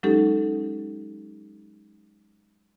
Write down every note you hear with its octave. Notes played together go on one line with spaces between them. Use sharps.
F#3 G#3 C#4 D#4 G4 A4